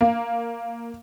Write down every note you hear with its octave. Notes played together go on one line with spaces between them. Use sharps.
A#3